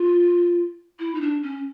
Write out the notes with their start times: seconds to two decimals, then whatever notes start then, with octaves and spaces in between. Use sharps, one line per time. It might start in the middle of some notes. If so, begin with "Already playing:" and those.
Already playing: F4
0.99 E4
1.15 D#4
1.21 D4
1.43 C#4